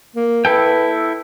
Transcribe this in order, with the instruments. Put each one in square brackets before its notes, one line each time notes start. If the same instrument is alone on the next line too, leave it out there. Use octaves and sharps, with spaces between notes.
[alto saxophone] A#3
[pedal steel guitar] E4 A4 G5 [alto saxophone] B4